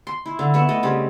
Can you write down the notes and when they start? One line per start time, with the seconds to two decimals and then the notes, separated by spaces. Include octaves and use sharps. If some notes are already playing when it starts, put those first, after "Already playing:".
0.07 C6
0.26 E4
0.39 D3
0.54 B3 E5 C#6
0.69 A3 D#5
0.83 C#3 G3 C4